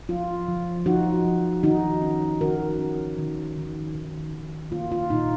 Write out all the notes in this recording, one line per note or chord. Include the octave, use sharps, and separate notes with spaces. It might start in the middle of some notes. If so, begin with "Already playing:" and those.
F3 F4
F3
F3 D#4 F#4
F3
D#3 D#4 F#4
C#4
D#3 F#4 A#4
C#4
D#3
D#3
D#3
D#3
A#3 F4
F4
A#2 D#4